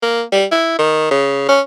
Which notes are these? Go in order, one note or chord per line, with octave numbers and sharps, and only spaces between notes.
A#3
G3
E4
D#3
C#3
C#4